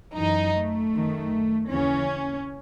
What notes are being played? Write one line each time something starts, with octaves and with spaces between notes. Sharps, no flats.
F#2 E3 D#4
A3
F#2 D#3
D#2 C#3 E3 C#4